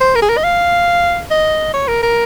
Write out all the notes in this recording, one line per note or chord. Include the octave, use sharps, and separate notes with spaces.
C5
A#4
G#4
A#4
D#5
F5
D#5
C#5
A#4
A#4